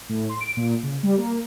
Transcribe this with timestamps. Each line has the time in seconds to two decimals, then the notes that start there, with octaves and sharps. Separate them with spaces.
0.09 A2
0.29 C6
0.40 D7
0.57 A#2
0.83 C#3
1.03 G3
1.17 A#3